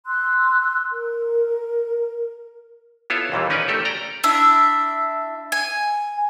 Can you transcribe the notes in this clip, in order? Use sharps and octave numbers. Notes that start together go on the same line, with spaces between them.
C6 E6 F#6
A#4
B3 E4 F4 A4 C#5
D#2 A#2 E3 G3
C#4 D#4 A#4 B4 D5 G#5
A3 G4 A4 A#4
D5 G5 A#5
D4 E4 E5
G#5